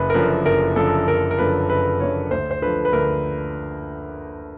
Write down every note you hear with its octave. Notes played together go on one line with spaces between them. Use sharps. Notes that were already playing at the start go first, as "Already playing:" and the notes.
Already playing: F#1 B4
A#4
F#2 D3 F3 B4
F#1 A#4
F#2 D3 F3 A4
F#1 A#4
A#4
F#2 D3 F3 B4
F#1 B4
F#2 D3 F3 C#5
D2 C5
C5
D3 F3 B4
B4
D2 A#4